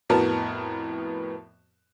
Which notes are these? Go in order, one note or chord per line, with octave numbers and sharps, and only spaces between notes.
F2 A2 B3 F#4 A#4 A5